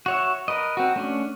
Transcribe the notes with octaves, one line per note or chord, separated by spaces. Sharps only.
F#4 C#5 E5
A#4 B4 D#5
C4 F#4
A3 C#4 D4